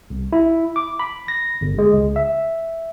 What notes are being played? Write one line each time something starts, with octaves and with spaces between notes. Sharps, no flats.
C2
E4
D6
B5
A#6
G1
G#3
C#2
E5